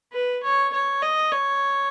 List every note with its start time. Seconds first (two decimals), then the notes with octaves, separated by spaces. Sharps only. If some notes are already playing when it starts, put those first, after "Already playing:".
0.13 B4
0.43 C#5
0.74 C#5
1.03 D#5
1.32 C#5